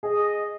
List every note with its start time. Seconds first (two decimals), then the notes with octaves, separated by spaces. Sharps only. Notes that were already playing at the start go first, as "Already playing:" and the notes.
0.03 G#4 D#5